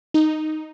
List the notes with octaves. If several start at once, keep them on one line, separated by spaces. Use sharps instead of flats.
D#4